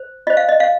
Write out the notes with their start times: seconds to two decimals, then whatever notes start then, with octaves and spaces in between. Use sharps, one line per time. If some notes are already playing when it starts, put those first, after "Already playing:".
Already playing: C5
0.27 F4 C5 D#5
0.37 F5
0.49 D#5
0.60 F5